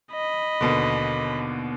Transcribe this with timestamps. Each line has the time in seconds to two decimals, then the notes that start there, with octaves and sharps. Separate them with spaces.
0.12 D#5 B5
0.61 D#2 B2 D3